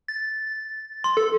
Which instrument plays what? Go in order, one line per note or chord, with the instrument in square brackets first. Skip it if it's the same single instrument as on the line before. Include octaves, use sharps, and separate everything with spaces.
[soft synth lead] A6
[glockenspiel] C6
[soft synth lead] A4